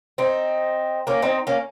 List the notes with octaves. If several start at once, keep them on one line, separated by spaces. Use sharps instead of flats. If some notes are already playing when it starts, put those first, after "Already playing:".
C4 D#4
A#3 C#4
C4 D#4
A#3 C#4